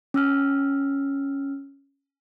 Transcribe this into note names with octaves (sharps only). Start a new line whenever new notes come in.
C#4 E6 F6